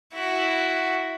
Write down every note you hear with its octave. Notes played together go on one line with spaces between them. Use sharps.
E4 F#4